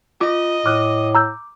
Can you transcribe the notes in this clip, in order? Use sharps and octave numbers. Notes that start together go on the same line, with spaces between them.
F4 D#5 D6
A2 D6 F6 F#6
A#5 E6 G6